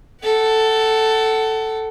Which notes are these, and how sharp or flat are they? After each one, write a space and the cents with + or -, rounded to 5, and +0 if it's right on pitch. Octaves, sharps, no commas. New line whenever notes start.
A4 +0 F#5 +30